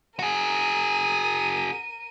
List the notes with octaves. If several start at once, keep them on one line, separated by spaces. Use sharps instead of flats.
F#4 G#4 A#4 D#7